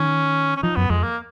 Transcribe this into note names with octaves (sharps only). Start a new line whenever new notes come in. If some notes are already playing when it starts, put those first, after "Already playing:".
Already playing: D#3 C#4
C#4
F3 D#4
F#2 B3
F2 G#3
A#3